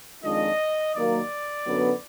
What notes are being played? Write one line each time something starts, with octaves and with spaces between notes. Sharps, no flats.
F2 D#3 G#3 D4 F4 D#5
D#3 F#3 A#3 D5
F#2 D3 F#3 B3